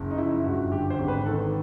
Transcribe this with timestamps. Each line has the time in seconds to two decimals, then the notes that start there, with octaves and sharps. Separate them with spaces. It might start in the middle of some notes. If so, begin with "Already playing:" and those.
Already playing: F#1
0.11 D#4
0.17 F3 E4
0.44 G2 F#4
0.72 D3 G4
0.90 C5
0.99 G#1
1.08 B4
1.26 D#3 A4